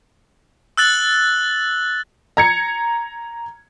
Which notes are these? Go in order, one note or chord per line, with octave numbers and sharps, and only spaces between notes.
E6 F#6 A6 F#7
A#5 G#6 C#7